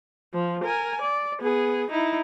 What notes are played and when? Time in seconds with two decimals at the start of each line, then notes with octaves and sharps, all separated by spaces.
0.33 F3
0.64 A#4 G#5
1.01 D5
1.41 B3 G#4
1.90 D#4 E4